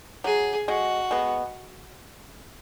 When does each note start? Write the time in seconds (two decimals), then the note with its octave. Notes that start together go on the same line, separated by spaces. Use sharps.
0.24 F#3 G#4
0.68 G#3 F#4
1.11 G#3 B3